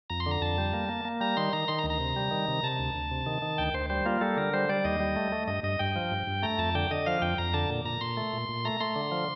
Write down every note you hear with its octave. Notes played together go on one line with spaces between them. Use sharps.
F2 A#5
C6
D3
A#5
F2 A5
G3
A#3
A#3
A#3
G3 A#5
D#3 C6
D#3 A#5
D#3 C6
A#5
D2
A#5
C3
G3
D#3
C3
C3 A5
D2
D2
C3
D#3
D#3
D2 G5
D2 C5
G3 C5
A#3 F4
G3 A4
D3 A#4
G3 C5
G3 D5
D#2 D#5
G3
A3
A3
G2 D#5
G2 D#5
G2 G5
F3
G2
G2
A3 A#5
F2 A5
D3 G5
D3 D#5
F3 F5
F2 G5
F2 A#5
D3 A5
A#2
A#2 A#5
A#2 C6
A3
A#2
A#2
A3 A#5
A3 C6
D3
F3